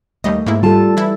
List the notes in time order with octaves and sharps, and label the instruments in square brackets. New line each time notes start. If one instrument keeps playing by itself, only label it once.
[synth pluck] D#2 G3 D#5 [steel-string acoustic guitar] A3
[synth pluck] G#2 A#3 E4
[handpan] G3 A4 [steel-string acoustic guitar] F4 A5
[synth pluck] E3 E4